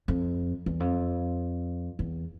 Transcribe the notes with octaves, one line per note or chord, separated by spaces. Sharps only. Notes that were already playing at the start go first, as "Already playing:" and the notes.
F2
E2
F2
E2